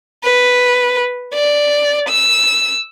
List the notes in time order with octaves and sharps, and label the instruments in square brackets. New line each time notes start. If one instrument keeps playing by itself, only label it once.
[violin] B4
D5
E6